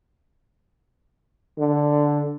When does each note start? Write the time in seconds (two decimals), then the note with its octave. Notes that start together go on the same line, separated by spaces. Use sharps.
1.59 D3